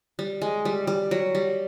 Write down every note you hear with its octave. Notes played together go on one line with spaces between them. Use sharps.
G3
G#3
G3
G3
F#3
G3